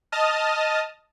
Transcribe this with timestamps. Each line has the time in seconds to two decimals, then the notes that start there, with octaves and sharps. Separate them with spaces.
0.12 D#5 A5 D#6 F6